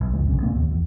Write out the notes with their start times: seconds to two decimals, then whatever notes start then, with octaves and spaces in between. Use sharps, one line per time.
0.01 B1
0.14 F#1 C#2 G#3
0.27 B1 C#3
0.43 A#2 A#3 B3
0.55 D#2
0.71 E2